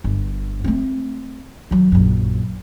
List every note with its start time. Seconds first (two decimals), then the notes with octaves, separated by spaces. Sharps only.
0.04 G1
0.64 A3 C4
1.71 D#3 F#3
1.92 A#1 F#2